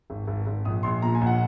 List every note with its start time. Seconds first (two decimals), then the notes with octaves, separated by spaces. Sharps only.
0.10 G#1
0.27 G#1
0.47 G#1
0.65 A#1 D#6
0.83 A#1 C6
1.02 A#2 A#5
1.15 G#5
1.21 A#1
1.27 F#5